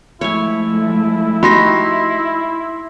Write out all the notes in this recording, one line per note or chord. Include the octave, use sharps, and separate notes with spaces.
F3 G#3 A3 E4 C#5 G#5
D#4 F#4 G4 B5 C6 A#6